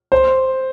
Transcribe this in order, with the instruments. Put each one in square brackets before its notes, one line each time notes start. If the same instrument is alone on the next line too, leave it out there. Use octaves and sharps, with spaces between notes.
[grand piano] C5